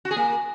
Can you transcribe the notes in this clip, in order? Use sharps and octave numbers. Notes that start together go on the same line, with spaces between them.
F#4
G#4
A#3